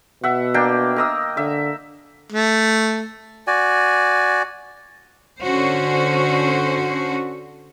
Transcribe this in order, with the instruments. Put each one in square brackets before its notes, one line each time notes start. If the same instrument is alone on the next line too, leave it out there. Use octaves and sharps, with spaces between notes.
[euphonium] B2 [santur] E5 F#5
[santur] A#3 D4 G5
A#4 D#5 E6
[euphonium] D3 [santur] E5
[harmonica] A3
[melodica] F#4 D5 G#5
[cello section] D3 C#4 F#4 C5